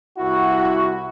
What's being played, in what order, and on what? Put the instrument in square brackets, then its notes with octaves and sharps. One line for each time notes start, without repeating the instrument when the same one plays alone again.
[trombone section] C2 E4 F#4